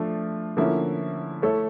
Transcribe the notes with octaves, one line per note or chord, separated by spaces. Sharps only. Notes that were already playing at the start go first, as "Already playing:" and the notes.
Already playing: F3 A3 D4 F4 A4
D3 F3 A#3 C#4 E4
A3 E4 A4 C#5